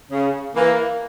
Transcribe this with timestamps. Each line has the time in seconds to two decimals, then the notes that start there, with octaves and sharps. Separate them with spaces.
0.11 C#3
0.55 E3 A#3